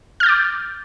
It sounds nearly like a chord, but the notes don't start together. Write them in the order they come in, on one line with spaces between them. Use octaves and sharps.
F6 G6 A6 D6